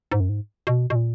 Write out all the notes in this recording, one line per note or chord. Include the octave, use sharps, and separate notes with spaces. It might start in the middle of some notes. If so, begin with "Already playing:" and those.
G#2
F#2
G#2
B2
B2
A#2